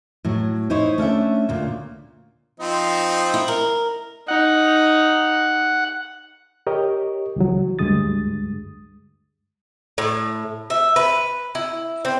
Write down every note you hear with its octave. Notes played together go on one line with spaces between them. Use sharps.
A2 F#3
D#4 E4 C5 C#5
A3 C#4 D4 E5
D2 A#2
F3 C4 D#4
E4
A#4
D#4 F#5
G4 A#4 C#5 D#5
C#2 E3 F#3
D2 G2 G#3 D#6 A6
A2
E5
B4
E4
C4